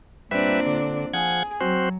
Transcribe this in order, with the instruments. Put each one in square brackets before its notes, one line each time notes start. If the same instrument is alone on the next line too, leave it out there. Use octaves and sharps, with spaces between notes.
[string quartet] A#2 C4 D4 [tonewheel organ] G3 B4 E5
[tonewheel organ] D3
[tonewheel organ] F3 F#5 G#6 [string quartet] G#4
[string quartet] F#3 [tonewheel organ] C4 F#4 C5